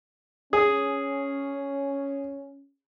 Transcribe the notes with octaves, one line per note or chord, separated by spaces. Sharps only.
C#4 G#4